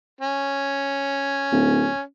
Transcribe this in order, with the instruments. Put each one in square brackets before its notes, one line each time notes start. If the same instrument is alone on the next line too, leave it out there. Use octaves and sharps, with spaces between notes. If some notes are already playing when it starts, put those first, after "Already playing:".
[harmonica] C#4
[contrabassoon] D1